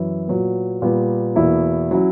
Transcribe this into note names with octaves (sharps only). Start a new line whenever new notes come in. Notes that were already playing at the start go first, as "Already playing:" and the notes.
Already playing: F#2 E3 E4
A#2 F#3 B3
A#2 G3 B3
E2 B2 A#3 E4
F#3 C#4 E4